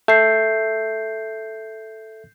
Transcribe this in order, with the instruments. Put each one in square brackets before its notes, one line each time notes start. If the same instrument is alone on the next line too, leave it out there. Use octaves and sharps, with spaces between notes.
[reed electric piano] A4 E5 [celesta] G6 C7